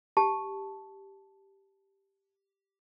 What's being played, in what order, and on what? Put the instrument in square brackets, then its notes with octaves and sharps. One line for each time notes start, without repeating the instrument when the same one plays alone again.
[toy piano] G4 A5